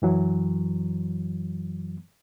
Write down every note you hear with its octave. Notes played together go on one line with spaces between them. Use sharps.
F#2 E3 F#3